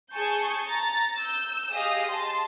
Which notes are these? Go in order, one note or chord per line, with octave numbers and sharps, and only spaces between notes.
G#4 G#5 A5 C#6 G6
A#5 A6
E6 G6
G4 G#4 D#5 F5 D#6
A5 C6